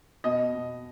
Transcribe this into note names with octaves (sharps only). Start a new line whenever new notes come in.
B2 D#5
B2